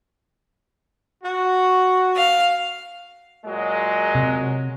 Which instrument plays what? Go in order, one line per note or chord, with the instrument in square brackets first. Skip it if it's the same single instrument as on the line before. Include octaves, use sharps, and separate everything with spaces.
[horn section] F#4
[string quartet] F5
[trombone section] A#2 F#3 G#3
[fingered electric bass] C3